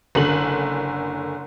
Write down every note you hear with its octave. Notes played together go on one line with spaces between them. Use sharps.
F#1 D3 F#7